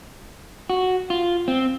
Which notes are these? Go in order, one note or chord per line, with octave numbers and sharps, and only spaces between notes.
F#4
F4
C4